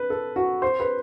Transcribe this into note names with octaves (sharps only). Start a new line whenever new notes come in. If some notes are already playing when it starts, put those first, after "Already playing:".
Already playing: B4
A4
F#4
C5
B4